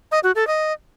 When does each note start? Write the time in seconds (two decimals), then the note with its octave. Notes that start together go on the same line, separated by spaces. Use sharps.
0.12 D#5
0.24 F#4
0.35 A4
0.47 D#5